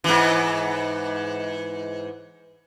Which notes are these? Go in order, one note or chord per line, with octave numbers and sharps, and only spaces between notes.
G#2 E3